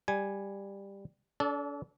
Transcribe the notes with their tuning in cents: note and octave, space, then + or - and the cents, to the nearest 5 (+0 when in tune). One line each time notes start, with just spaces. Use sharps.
G3 +10 G#5 +0
D4 -45 A4 -20 D5 +0